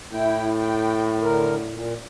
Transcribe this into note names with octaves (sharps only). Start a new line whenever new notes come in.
A2 E4 G5
G5
D3 A#4
A#2